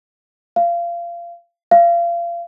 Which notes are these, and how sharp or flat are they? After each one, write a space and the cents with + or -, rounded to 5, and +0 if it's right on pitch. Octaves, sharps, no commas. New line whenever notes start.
F5 -25
F5 -30